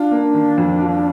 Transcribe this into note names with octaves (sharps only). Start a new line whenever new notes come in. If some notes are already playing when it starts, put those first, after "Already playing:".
Already playing: D4 F4
A#3
D#3
F2
F4